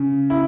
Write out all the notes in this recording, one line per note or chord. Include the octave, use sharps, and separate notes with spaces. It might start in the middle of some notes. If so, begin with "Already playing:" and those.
Already playing: C#3
E4